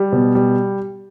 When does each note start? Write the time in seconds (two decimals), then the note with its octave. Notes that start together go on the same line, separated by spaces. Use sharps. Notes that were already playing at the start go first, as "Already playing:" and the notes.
Already playing: G3
0.12 B2
0.35 G3